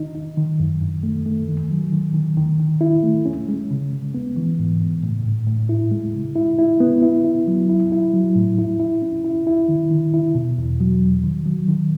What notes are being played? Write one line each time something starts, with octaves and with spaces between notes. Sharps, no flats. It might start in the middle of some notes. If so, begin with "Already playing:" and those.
Already playing: D#3 D#4
D#4
D#3
F#2
F#2
A3
A3
D#3
F#3
D#3
D#3
D#3
D#3
E4
A3
C#4
G#3
C#3
C#3
B3
E3
G#2
G#2
A2
A2
A2
E4
G#3
C#3
E4
E4
B3
E4
E4
F#3
E4
E4
F#3
A2
E4
E4
C#4
E4
E4
D#3
D#3
E4
B2
E2
F#3
E2
D#3
F#3
D#3